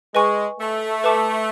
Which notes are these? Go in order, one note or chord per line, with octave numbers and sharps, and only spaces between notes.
G#3 B4 D#5 G#5 C#6
A3
B4 E5 A5 D6